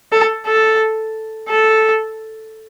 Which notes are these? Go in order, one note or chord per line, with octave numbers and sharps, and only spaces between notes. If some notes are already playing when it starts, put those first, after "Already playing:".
A4
A4
A4